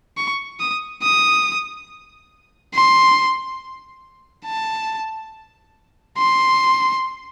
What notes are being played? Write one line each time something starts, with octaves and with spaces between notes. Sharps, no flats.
C#6
D#6
D#6
C6
A5
C6